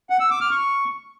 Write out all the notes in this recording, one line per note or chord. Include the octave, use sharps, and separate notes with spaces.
F#5
E6
D6
F6
C#6